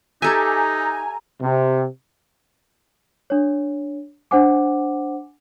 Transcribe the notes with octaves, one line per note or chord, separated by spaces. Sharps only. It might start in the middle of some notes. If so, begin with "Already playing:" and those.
D#4 G4 A4 E5 G#5 A#5
C3
D4 C#5
D4 C5 F#5 G#5 D6